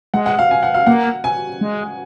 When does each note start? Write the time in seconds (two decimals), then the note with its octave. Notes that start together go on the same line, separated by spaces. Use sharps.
0.14 G#3 F#5
0.26 F#5
0.39 F5
0.51 G#5
0.63 F#5
0.74 F5
0.87 A#3 F#5
1.24 G#5
1.61 G#3